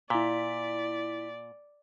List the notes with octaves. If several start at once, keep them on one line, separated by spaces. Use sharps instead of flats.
A#2 E4 D5 B6